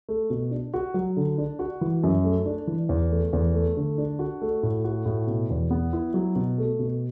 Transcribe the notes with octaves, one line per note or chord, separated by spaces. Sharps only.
A3
B2
D4
F#4
F#3
D3
D4
F#4
E3
F#2
A3
D4
E3
E2
A3
E2
A3
D3
D4
F#4
A3
A2
F#4
A2
B2
E2
B3
E4
F#3
B2
A3
B2